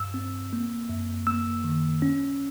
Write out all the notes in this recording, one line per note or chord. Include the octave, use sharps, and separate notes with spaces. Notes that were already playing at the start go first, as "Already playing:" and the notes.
Already playing: G2 E6
C4
A#3
F#2
A#3 E6
D#3
C#4